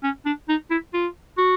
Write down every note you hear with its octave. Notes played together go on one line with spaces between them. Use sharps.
C#4
D4
D#4
E4
F4
F#4